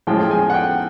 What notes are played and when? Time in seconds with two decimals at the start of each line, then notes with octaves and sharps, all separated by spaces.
0.07 A2 F3 G#3 G5
0.20 G5
0.31 G#5
0.50 F#5
0.54 G5